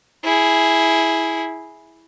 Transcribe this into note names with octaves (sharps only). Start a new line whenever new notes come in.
E4 G#4